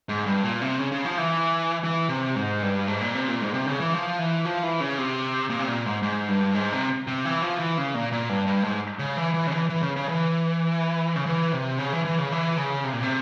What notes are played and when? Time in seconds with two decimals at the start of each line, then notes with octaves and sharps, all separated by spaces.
0.09 G#2
0.26 G2
0.44 A#2
0.62 C3
0.78 C#3
0.92 C#3
1.05 F3
1.17 E3
1.84 E3
2.09 C3
2.35 G#2
2.63 G2
2.88 G#2
3.01 A#2
3.14 C3
3.28 A#2
3.41 G#2
3.54 C3
3.66 C#3
3.80 E3
3.94 F3
4.19 E3
4.45 F3
4.63 E3
4.80 C#3
4.98 C3
5.50 A#2
5.59 C3
5.67 A#2
5.86 G#2
6.03 G#2
6.28 G2
6.55 G#2
6.73 C3
7.07 C3
7.25 E3
7.42 F3
7.60 E3
7.78 C#3
7.94 A#2
8.12 A#2
8.29 G2
8.47 G2
8.64 G#2
8.99 C#3
9.17 E3
9.34 E3
9.47 C#3
9.52 E3
9.70 E3
9.83 C#3
9.96 C#3
10.08 E3
11.16 C#3
11.26 E3
11.53 C3
11.79 C#3
11.93 E3
12.05 E3
12.18 C#3
12.32 E3
12.58 C#3
12.84 C3
12.93 A#2
13.03 C3